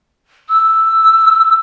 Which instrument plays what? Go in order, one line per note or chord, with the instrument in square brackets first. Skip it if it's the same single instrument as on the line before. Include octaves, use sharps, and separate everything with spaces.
[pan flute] E6